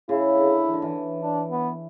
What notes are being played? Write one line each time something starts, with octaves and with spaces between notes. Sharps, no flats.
C#3 E4
D3
E3
D3
E3
D4
B3